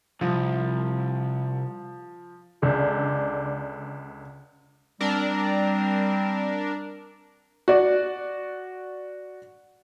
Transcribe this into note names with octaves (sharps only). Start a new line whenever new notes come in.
C2 F3
C#2 D3 D4
G3 C4 D4 A#4
F#4 D5